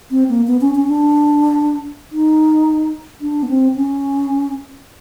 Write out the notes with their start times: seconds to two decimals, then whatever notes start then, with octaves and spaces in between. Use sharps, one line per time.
0.11 C4
0.29 A#3
0.47 B3
0.61 C#4
0.75 C#4
0.88 D4
2.12 D#4
3.21 D4
3.43 B3
3.48 C4
3.76 C#4